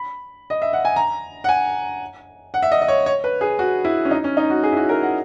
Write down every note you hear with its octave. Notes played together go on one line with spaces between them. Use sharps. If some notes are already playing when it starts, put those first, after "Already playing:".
Already playing: B5
D#5
E5
F#5
G#5
A#5
F#5
G#5
F#5
E5
D#5
D#5
C#5
C#5
B4
G#4
F#4
E4
C#4
D#4
C#4
D#4
F#4
G#4
E4
F#4
A#4
F#5